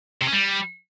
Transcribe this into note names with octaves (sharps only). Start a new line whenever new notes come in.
C3
C#4
G3